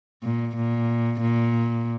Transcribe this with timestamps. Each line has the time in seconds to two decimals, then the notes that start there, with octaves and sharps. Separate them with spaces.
0.23 A#2
0.56 A#2
1.21 A#2